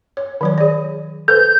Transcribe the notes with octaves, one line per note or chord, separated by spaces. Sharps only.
C#5
D#3 F#3 C#5
G#4 D5
A4 B4 C5 G6